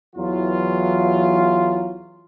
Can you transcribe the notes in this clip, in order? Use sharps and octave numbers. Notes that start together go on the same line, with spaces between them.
E2 E3 F#3 F4